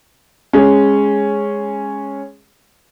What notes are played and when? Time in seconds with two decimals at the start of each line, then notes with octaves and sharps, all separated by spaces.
0.53 G#3 C#4